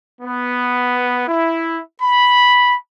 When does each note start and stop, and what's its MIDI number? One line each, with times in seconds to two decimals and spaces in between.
0.21 1.27 59
1.28 1.79 64
2.02 2.73 83